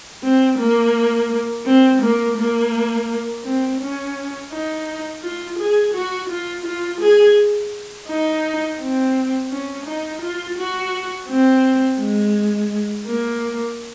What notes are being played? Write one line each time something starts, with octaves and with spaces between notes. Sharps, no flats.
C4
A#3
C4
A#3
A#3
C4
C#4
D#4
F4
G#4
F#4
F4
F4
G#4
D#4
C4
C#4
D#4
F4
F#4
C4
G#3
A#3